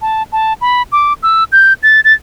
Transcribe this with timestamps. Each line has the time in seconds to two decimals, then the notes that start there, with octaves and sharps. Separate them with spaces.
0.02 A5
0.32 A5
0.61 B5
0.92 D6
1.23 E6
1.52 G6
1.83 A6
2.05 A6